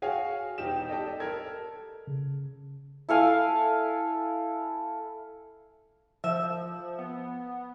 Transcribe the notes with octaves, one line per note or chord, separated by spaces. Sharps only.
F#4 G#4 C#5 F5 G#5
E1 D#4 G4 E7
G4 A4 D5 D#5 G5
A4 A#4 G#6
C#3
E4 A4 F5 G#5
F3 E5
B3